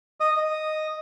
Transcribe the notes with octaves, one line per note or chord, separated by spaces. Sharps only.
D#5
D#5